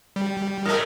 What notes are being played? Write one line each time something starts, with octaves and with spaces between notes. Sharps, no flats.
G3
A2 A3 A#4 D#5